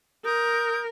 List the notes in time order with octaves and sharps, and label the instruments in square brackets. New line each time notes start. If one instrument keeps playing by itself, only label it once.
[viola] A#4 [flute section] D#6 G6